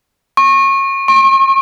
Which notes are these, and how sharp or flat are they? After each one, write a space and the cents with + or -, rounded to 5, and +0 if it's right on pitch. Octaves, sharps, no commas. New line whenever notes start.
C#6 -25
C#6 -45